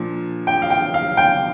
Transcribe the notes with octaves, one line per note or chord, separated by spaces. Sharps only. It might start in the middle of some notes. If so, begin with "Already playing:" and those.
Already playing: A#2 F3 D4
G5
F5
G5
F5
G5